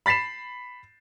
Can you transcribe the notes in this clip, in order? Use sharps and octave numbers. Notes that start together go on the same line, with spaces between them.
B5 A6 B6 C7 E7